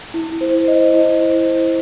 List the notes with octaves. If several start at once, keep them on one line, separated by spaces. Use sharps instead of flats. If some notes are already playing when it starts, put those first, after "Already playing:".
E4
C5
D#5
E4
C5
E4